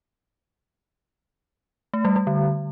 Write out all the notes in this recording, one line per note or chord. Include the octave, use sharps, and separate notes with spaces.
A3
G3
G3
D3